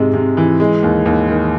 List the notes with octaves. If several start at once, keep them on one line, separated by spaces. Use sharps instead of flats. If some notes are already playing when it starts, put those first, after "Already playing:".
Already playing: G#2 C3 G#3
C3
E3
G#3
D#2
D#2
D#3